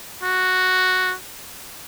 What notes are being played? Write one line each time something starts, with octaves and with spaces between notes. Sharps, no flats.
F#4